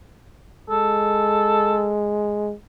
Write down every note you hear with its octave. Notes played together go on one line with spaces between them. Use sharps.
G#3 A4